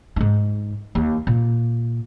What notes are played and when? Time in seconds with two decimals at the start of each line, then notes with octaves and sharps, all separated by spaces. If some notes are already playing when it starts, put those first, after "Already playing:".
0.16 G#2 D#4
0.95 D#2
1.27 A#2